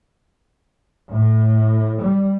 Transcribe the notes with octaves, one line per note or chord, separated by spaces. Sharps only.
A2
G3